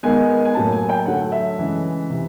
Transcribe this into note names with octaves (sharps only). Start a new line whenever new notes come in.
D#3 G#3 B3 G#5
G#5
A2 F#3 A#3 A5
G#5
G5
D3 F#3 A3 F#5
E5
C#3 E3 G#3
C3 E3